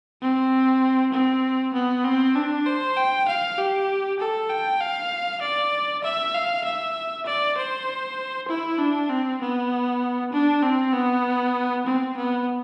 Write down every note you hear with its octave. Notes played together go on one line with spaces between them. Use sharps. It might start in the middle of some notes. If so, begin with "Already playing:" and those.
C4
C4
B3
C4
D4
C5
G5
F5
G4
A4
G5
F5
D5
E5
F5
E5
D5
C5
E4
D4
C4
B3
D4
C4
B3
C4
B3